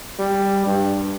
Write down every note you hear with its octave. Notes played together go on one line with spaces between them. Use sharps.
G3
G2